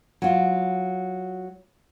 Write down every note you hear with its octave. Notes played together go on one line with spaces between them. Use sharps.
F#3 F4